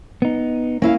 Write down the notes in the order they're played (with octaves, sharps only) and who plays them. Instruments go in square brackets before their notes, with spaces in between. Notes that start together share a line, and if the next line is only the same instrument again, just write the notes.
[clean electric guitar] B3 D#4
[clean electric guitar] A#3 [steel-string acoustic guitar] C#4 E4 F5